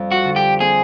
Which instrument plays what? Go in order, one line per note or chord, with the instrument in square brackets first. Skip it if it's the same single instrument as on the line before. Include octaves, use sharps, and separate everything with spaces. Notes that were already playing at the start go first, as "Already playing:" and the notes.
Already playing: [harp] F2 G3
[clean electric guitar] F#4
[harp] D3
[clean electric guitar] G4
[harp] C4 [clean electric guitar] G#4